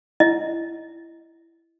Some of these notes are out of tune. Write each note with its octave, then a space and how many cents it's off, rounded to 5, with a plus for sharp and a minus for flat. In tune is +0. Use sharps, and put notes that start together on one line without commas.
E4 +10 D#5 +5